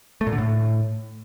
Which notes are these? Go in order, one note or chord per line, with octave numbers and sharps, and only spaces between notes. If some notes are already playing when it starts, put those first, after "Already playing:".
A3
A#2
D3
A2